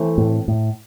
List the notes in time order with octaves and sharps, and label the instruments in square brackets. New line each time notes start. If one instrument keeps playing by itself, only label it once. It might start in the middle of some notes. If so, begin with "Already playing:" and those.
Already playing: [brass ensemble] E3 A3 C4
[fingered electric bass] A2
A2